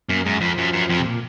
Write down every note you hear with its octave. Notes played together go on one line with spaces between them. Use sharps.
F#2 A#3
F#2 G#3
F2 F3
F#2
F#2
F2
C3
A#2